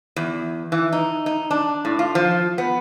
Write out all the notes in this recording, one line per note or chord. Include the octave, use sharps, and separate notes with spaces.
E2
E3
D#4
D#4
D4
A2
F4
F3
B3